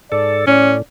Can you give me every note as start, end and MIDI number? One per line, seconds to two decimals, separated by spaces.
0.12 0.46 44
0.12 0.46 69
0.12 0.43 74
0.47 0.82 45
0.47 0.74 61
0.47 0.80 74